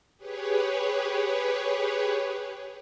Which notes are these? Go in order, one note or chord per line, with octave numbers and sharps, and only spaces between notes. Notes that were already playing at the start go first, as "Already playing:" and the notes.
G4 G#4 B4 C#5